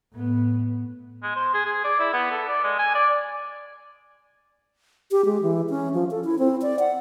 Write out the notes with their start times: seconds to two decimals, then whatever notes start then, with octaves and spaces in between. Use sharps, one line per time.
0.13 A2 B3
1.23 G#3
1.36 C5
1.54 G#4
1.66 G#4
1.84 D5
1.99 E4
2.13 B3
2.31 A4
2.48 D5
2.63 G#3
2.79 G#5
2.94 D5
5.11 G4
5.25 G#3
5.42 E3
5.70 C#4
5.94 F3
6.11 A4
6.24 E4
6.39 C4
6.62 D5
6.79 F#5